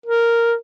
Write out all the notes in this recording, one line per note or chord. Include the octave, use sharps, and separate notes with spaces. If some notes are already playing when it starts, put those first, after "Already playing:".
A#4